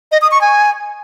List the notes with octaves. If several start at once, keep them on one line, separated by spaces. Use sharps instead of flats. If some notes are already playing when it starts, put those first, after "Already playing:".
D#5
D#6
C#6
G#5